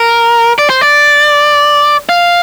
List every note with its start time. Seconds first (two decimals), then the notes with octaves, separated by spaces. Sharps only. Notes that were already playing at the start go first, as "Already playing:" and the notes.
Already playing: A#4
0.59 D5
0.70 C5
0.81 D5
2.09 F5